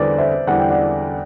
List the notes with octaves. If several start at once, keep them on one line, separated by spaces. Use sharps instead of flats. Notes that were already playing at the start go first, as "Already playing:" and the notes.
Already playing: E2 D3 G3 B4 C5 D5
C5 E5
E2 D3 G3 F#5
G5
D5 F#5